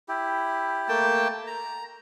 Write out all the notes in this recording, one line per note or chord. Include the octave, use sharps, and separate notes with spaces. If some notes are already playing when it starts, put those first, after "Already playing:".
E4 G4
A3 A#3 G5 A5
A#5